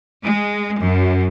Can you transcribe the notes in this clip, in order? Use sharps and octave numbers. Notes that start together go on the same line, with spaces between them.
G#3
F#2